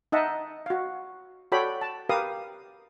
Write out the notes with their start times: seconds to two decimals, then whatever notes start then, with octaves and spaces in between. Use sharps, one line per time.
0.12 D#4 D#5 E5 F#5 A5
0.66 F#4 F5
1.52 F#4 A4 C#5 D5 G5 B5
1.81 A5
2.09 G4 A#4 B4 F5 D#6